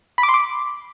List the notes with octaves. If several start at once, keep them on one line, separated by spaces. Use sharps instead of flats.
B5
D6
C6
D6